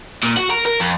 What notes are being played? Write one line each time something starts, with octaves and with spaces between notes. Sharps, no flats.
A#2
F#4
A#4
A#4
F2